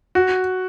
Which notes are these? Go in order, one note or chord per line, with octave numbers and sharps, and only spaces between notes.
F#4